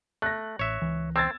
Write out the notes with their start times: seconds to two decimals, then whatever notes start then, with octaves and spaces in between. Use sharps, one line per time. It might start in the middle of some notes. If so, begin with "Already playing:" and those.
0.22 A3 F#6 A#6
0.59 A1 C#5 E5
0.82 C#2 E3
1.16 C4 E6 G#6 A6